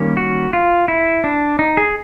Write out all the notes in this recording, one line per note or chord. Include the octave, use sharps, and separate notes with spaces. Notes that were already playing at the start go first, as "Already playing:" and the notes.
Already playing: D#3 G3 A#3 C#4
F#4
F4
E4
D4
D#4
G#4